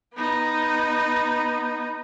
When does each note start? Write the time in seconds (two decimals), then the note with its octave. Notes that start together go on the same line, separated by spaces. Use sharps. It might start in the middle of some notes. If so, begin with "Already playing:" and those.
0.15 B3 D#4